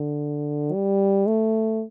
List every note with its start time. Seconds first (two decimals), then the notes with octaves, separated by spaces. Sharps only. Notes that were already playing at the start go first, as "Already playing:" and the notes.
Already playing: D3
0.73 G3
1.27 A3